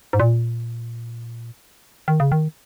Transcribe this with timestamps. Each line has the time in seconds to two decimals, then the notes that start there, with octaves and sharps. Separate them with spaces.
0.13 G#2
0.20 A#2
2.08 D#3
2.20 C#3
2.32 D#3